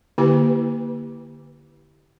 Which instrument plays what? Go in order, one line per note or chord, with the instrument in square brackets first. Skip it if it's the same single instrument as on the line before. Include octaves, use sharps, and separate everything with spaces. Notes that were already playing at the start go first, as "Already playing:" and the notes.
[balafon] D3 A#3 E4 G4 B4